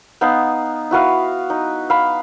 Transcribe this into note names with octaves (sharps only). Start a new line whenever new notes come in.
B3 D#4 F5
E4 F#4 B4 F5
D#4
F5 B5